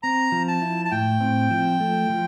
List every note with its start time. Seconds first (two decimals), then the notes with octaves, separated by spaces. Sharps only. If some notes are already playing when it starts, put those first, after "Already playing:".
0.03 C4 A#5
0.32 F3
0.48 A5
0.62 E4
0.85 A5
0.91 A2 G5
1.21 C4
1.51 F3
1.80 A3
2.10 F3